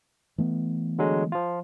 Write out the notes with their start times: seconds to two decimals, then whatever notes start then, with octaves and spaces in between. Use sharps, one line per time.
0.38 E3 A3 B3
0.98 D3 F#3 G#3
1.32 F3 F4